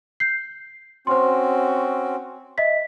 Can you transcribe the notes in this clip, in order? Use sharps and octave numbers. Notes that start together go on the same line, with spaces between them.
G6 C7
C4 C#4 F#4 C5 C6
D#5 E5 B6